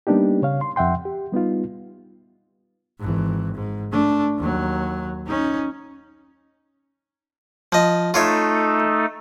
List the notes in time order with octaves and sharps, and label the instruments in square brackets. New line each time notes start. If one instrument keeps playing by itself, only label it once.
[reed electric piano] G3 A#3 B3 D4 D#4 G4
C#3 C#5 F5
C6
F2 E5 F#5 G5 C6
G4
G3 B3 D#4 F4
[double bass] G#1 E3
G#2
A3 D4
D#2 F#3
C#4 D#4
[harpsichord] F3 D#5
[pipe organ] A3 D#4 A4 [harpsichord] F4 C#5 E5